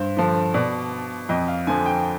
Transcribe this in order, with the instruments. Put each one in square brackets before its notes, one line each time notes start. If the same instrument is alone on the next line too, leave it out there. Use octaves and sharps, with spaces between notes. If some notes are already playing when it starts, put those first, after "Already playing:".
Already playing: [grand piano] G2 C5
D3 F3
B2 D5
F2 D#5
F5
D3 F3 G#5
G5